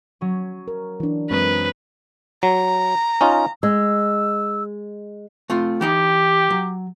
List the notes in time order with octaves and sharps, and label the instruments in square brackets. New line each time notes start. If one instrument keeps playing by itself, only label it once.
[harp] F#3 C#4
[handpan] A#4
E3 D4
[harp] F#2 A#5 D#6 [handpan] G#3 C4 [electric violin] B4
[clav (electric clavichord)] F#3 [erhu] A#5
[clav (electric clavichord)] C#4 D#4 F4
[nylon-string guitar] G#3 [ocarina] E6
[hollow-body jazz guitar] A3 C4 F4
[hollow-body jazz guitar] E3 D#4 G5 [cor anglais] G4
[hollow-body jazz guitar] F#3